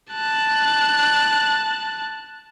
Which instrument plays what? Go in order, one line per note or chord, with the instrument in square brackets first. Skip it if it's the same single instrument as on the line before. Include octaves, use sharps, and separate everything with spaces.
[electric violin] A5 F#6